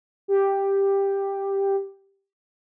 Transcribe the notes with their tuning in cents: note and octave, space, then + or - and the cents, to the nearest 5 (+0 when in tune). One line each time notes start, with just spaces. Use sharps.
G4 +5